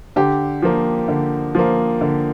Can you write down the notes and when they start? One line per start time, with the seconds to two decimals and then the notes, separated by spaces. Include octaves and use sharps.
0.16 D3 G4
0.62 F3 A#3
1.08 D3
1.55 F3 A#3
2.01 D3